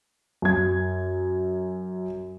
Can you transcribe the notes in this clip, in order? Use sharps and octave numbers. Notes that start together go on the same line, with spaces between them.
F#2 G#6